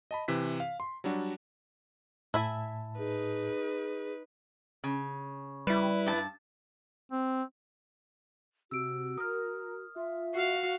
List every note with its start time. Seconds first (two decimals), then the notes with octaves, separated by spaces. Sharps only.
0.11 D#5 A5 B5
0.28 C3 E3 B6
0.60 F5
0.80 C6
1.04 F#3 G3 D4 F#4
2.34 A2 E4 E5 G#5 A5
2.98 D#4 G#4 B4
4.84 C#3
5.67 G3 E4 B4
6.06 G2 A5
7.12 C4
8.71 C3 F#4 E6 D7
9.18 A#4 D#6 F6
9.96 F4 E5
10.34 F#4 F5 C7